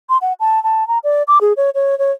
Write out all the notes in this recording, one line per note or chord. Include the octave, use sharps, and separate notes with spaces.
C6
F#5
A5
A5
A#5
D5
D6
G#4
C#5
C#5
C#5